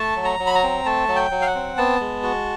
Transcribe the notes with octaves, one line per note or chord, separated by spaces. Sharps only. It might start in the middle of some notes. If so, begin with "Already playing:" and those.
Already playing: A3 A5
F#3
A#5
F#3
B5
A#5
C4
A3 A5
F#3
G5
F#3
F5
F#5
C4
B3 A5
G#3
F#4